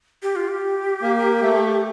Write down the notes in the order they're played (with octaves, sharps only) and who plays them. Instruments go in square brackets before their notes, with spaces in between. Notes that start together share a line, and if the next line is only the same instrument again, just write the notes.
[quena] G4
F4
G4
[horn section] A#3
A3